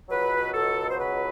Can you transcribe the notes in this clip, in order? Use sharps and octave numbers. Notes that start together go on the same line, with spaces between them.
C#2 B2 F#3 B4
A4
C5
B4